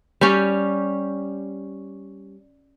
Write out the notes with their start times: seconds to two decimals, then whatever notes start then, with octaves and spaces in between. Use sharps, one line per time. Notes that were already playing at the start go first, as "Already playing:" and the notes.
0.21 G3 C#4 G4